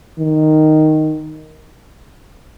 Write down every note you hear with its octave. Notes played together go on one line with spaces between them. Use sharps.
D#3